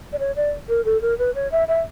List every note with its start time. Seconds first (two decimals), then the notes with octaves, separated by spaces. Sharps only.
0.13 D5
0.19 C#5
0.36 D5
0.69 A#4
0.85 A4
1.02 A#4
1.18 B4
1.35 C#5
1.51 E5
1.68 E5